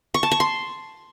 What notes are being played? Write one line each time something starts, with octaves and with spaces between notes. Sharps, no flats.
C#6
A5
C#6
C6